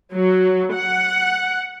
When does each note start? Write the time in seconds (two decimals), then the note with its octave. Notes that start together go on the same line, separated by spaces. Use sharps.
0.15 F#3
0.75 F#5